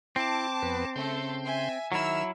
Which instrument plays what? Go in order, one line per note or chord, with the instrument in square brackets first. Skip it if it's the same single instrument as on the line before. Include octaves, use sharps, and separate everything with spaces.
[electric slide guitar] C4 [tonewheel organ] E4 [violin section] A5 D6
[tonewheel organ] F2 B3 B4
[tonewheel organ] C#3 C6 G6 [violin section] A3 A4
[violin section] E5 G#5
[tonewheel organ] D#3 [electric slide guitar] F#3 E4 [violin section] E5 E6 F6